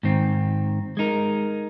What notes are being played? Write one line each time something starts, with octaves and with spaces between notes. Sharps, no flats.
G#2 D#3 C4
G#3 D#4 A#4